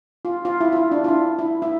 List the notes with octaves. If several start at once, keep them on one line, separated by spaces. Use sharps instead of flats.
F4
F4
E4
F4
E4
D4
F4
E4
E4
E4